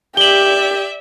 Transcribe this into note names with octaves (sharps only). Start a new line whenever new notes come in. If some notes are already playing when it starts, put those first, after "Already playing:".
G4 D5 E5 F#7 G7